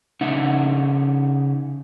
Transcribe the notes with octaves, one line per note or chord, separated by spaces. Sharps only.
C#3 D#4 E5 F#5